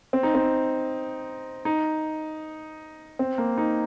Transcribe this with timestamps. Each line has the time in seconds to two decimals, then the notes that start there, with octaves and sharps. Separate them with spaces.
0.13 C4
0.23 D#4
0.34 C4
1.65 D#4
3.19 C4
3.38 A#3
3.58 D#4